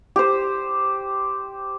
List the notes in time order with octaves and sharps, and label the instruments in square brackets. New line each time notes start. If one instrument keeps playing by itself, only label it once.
[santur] G4 C5